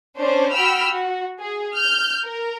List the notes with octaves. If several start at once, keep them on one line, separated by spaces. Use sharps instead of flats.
C#4 D4 C5
F#4 G5 B5 E6 F6
F#4
G#4
F6 G6
A#4